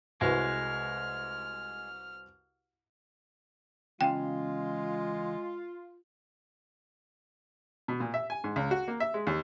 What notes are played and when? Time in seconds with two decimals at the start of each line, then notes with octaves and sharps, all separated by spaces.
0.21 C2 G#3 F#4 B4 F6
4.01 E2 C#3 G#3 F4 F5 G5
7.88 B2
8.00 A#2
8.14 E5
8.30 G#5
8.44 G#2
8.56 C#2
8.71 F#4
8.88 A#3
9.00 E5
9.14 G#3
9.27 D#2